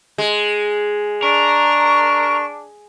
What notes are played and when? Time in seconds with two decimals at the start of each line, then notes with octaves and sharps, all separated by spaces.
0.18 G#3
1.22 D4 A#4 C#6